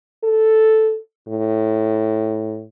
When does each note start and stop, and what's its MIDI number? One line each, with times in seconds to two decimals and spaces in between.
0.24 0.98 69
1.28 2.64 45